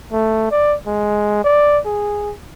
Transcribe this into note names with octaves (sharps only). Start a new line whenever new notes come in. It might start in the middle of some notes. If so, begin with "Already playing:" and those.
A3
D5
G#3
D5
G#4